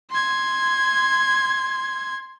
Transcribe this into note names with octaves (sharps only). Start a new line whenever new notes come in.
C6 G#6